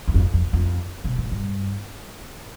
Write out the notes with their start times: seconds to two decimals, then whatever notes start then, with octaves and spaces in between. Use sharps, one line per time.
0.08 E2
0.14 F2
0.34 F2
0.53 F2
1.04 B2
1.18 A2
1.31 G2